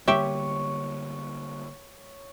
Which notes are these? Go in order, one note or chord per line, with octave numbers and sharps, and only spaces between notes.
D3 G3 A#3 G4 C#5 E5